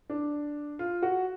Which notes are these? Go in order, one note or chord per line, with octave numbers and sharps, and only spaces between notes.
D4
F4
F#4